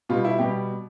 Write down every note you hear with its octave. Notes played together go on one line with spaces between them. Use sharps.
B2 G3 F4
E4
B2 G3 G4